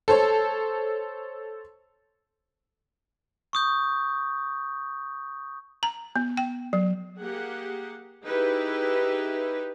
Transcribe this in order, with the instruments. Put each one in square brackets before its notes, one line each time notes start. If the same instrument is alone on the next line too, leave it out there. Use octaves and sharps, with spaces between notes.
[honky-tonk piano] A4 C5 C#5
[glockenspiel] C#6 D#6 G6
[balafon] A#5
B3
G5
F#3
[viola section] A#3 G4 G#4 F#5
D#4 E4 G4 G#4 B4